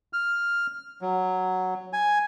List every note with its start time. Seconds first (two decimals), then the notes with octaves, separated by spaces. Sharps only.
0.13 F6
1.02 F#3
1.93 G#5